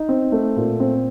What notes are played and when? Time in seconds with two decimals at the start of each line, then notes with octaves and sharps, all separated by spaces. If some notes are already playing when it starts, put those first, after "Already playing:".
Already playing: D#4
0.09 C4
0.32 A3
0.56 A#2
0.80 C4